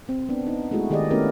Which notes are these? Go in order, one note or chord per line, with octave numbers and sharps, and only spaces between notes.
C4
B3 D4
B3 D#4
G#3 A3 E4 F#4 G#4
D#3 G4 G#4 D5 D#5
A3 B3 C#4 E4 G4 A#4